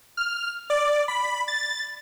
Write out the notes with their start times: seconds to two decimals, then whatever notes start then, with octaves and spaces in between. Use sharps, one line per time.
0.17 F6
0.70 D5
1.08 B5
1.48 A6